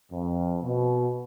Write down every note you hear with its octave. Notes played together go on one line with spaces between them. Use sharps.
F2
B2